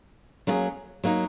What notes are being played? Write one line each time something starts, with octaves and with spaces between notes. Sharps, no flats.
F#3 A#3 C#4 E4 G#4
F#3 A#3 D#4